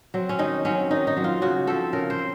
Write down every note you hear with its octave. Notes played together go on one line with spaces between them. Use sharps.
F#3 C4
C#4
D#3 D#4
F#3 C4 C#4
D#3 D#4
D#4
F#3 C4
F4
C#3 F#4
F3 C4 A4
C#3 A#4
C5
C4